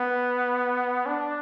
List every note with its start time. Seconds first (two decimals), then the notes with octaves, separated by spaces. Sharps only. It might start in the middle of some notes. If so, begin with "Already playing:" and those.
Already playing: B3
1.06 D4